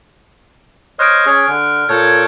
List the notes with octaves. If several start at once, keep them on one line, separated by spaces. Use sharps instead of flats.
C5 C#5 D#5 F6 F#6 D7
C#4 G#4 C#5
D3
A#2 A4 C#5 G6 G#6